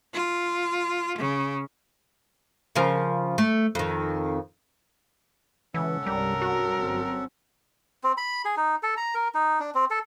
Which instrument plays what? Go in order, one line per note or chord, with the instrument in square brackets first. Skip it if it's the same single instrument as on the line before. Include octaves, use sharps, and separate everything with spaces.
[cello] F4
C#3
[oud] C#3 F3 A#4
A3
F2 D#3
[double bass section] C#3 G#3 [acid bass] E3 [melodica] C#4 A4 F#5
[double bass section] C2 G2 [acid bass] G3 [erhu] A#4
[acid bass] F#4
[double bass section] G1 F#3 C4
[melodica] C4
B5
G#4
D#4
A4
A#5
A#4
D#4
D4
C4
A4